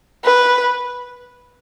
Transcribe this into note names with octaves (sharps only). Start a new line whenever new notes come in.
B4